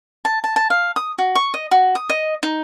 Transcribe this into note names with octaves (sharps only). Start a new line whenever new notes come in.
A5
A5
A5
F5
D#6
F#4
C#6
D#5
F#4
D#6
D#5
D#4